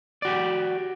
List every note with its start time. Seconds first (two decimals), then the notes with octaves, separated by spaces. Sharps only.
0.22 D5
0.25 F#4
0.28 G4